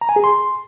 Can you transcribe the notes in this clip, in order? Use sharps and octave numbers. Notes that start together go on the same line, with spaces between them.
A#5
G#5
G#4
C6